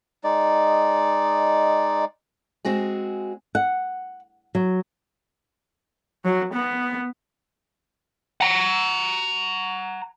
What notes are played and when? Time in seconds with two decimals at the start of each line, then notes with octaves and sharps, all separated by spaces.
0.24 G#3 D#4 D5
2.65 G#3 C4 F#4 G#4
3.55 F#5
4.55 F#3
6.25 F#3
6.53 B3
8.41 F#5 A#5